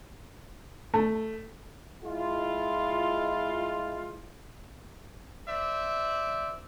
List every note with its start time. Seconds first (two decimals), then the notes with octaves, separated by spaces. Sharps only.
0.94 A3
2.04 G#3 E4 F4
5.46 C5 D5 E5